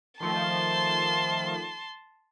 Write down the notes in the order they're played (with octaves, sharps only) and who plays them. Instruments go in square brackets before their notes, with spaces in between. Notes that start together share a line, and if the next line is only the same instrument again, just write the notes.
[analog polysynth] D#3 F3 A3 [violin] A5 C6